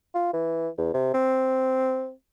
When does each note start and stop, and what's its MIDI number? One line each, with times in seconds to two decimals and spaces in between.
0.15 0.31 65
0.33 0.68 52
0.78 0.89 40
0.94 1.13 48
1.14 2.11 60